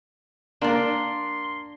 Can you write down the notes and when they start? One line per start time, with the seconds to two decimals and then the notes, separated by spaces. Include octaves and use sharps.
0.62 A#3 D4 A#4 D5 C6